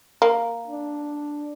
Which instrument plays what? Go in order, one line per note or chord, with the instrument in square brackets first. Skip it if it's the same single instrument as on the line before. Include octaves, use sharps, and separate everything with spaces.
[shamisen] A#3
[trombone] D4